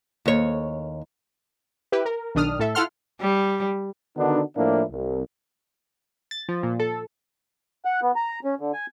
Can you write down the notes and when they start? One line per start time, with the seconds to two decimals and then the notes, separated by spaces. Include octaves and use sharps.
0.26 D#2 C#5
1.92 E4 G4 B4
2.05 A#4
2.35 B1 D#3 D4 D#6 F6
2.59 A2 A4 E5
2.75 E4 F4 A4 F#5 C6 F6
3.21 G3
4.17 D3 D#3 B3 D4 D#4 F#4
4.56 A2 F3 A#3 D4 E4
4.91 C2
6.31 A6
6.49 F3
6.63 A#2
6.80 A4
7.85 F#5
8.02 B3
8.16 A#5
8.44 C#4
8.60 D3
8.74 G#5